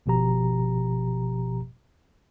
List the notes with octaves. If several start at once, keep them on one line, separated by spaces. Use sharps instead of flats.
G1 B2 F3 G4 A#5